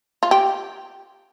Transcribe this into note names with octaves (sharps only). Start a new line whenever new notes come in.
F4
G4